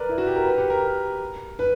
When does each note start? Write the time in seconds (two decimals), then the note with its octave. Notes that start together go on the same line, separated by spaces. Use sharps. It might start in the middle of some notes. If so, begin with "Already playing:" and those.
Already playing: A#4 B4 D5
0.09 E4
0.18 F#4
0.27 G4
0.36 A#4
0.45 B4
0.58 G4
0.70 A#4
1.59 B4